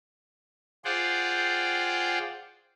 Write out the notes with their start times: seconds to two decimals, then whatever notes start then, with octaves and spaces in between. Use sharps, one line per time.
0.85 F4 G#4 C5 D5 F#5 G5